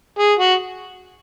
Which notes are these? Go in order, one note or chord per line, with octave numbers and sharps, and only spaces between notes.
G#4
F#4